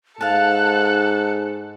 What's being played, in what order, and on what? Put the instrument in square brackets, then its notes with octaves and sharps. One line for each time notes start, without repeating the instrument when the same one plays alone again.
[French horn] G#2 [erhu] A4 [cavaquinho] F5 A5 [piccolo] F#6